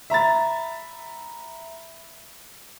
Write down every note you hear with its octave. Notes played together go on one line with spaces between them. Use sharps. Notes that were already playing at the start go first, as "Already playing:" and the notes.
E5 A#5 B5 A6